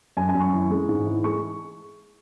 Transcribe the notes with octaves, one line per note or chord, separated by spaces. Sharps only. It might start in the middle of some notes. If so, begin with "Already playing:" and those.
F#2 G#5
G#5
F#2
C#6
E3
G#3
G#2
E3
G#3 C#6